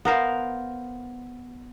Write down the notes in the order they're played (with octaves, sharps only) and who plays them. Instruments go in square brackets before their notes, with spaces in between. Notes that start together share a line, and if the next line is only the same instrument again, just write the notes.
[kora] B3 A#4 C5 F5